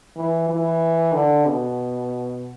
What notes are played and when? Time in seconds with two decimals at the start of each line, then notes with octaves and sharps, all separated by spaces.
0.16 E3
0.49 E3
1.13 D3
1.46 B2